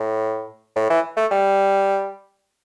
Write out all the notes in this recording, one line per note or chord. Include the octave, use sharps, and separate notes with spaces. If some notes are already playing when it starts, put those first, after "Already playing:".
Already playing: A2
A2
E3
A3
G3